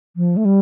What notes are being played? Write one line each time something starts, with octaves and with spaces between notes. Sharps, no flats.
F3
A3
G3